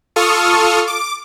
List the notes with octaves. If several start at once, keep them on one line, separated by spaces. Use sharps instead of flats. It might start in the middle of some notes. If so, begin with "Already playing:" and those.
F4 A4 C#6 D#6 F6
D6